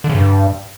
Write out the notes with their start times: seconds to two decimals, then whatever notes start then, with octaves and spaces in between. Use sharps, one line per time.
0.04 D3
0.09 C#3
0.15 G2